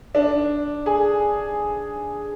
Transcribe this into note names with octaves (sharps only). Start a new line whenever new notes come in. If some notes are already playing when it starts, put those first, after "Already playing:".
D4
G#4